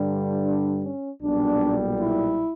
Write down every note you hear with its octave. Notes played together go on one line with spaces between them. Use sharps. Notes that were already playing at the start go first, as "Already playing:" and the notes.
Already playing: G2 D3 G3
D4
C#4
B1 A#2 G3 B3 D4
E4